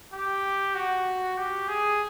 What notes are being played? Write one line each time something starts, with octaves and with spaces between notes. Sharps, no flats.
G4
F#4
G4
G#4